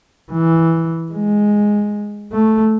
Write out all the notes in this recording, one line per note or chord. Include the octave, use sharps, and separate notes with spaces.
E3
G#3
A3